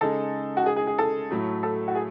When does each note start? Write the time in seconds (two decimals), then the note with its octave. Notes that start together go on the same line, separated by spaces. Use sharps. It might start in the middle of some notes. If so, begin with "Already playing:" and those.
0.01 C#3 G#3 D#4 G#4 A4
0.57 F#4
0.66 G#4
0.76 G#4
0.87 G#4
0.98 A4
1.31 A2 F#3 A3
1.63 A4
1.88 F#4
1.95 G#4